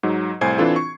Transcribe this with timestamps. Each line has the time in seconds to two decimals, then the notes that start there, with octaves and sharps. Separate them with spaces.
0.03 G#2 F#3 D#4
0.41 C2 A2 C5 G#5 G#6 C7
0.58 E3 C4 D4 F4 A4
0.76 C#6